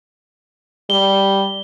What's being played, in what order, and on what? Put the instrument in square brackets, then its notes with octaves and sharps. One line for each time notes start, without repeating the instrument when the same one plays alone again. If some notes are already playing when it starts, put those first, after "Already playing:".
[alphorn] G3 [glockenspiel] G7